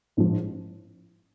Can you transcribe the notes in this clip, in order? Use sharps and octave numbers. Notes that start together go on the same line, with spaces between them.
A1 G#2 F3